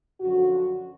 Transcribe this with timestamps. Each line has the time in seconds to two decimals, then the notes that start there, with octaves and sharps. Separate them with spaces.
0.20 F#2 D3 F3 F#4